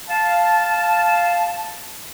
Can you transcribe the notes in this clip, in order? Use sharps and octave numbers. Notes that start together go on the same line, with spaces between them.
F5 A5